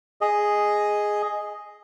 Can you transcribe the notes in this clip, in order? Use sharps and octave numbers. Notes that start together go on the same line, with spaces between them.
G#4 D#5